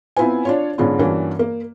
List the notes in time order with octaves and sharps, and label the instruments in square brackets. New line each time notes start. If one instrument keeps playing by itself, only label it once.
[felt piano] B3 C4 E4 F4 B4 G#5
D4 F4 C#5
G#2 D3 B3 C#4 D4 F4
G2 E3 A#3 C#4 D4 F#4
A#3